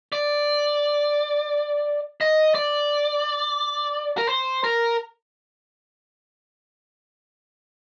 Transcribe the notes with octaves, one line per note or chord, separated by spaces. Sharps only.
D5
D#5
D5
A#4
C5
A#4